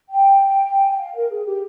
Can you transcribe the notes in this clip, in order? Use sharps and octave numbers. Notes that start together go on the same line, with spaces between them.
G5
G#5
G5
F5
A#4
G#4
G4